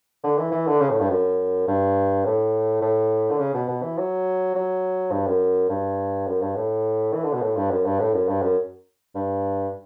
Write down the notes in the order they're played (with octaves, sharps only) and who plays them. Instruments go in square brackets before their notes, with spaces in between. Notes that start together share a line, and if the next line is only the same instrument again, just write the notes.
[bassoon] D3
E3
E3
D3
C#3
A2
G2
F#2
G2
A2
A2
D3
C#3
B2
B2
E3
F#3
F#3
G2
F#2
G2
F#2
G2
A2
E3
D3
B2
A2
G2
F#2
G2
A2
F#2
G2
F#2
G2